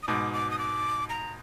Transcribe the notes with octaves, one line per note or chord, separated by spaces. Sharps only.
D#6
G#2 B2 D6
D6
D#6
D6
A#5